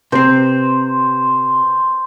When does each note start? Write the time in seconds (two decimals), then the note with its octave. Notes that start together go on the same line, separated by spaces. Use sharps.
0.12 C3 C4 C5